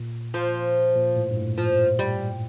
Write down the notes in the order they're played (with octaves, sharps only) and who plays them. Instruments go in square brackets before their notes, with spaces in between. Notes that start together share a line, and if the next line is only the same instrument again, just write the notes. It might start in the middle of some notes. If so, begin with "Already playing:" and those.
Already playing: [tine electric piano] A#2
[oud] F3
[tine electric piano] A#2
A2
G2
A2
[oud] F3
G3